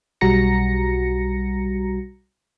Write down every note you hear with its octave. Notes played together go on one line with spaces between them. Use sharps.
B1 G3 F#4 A#5 A#6 C#7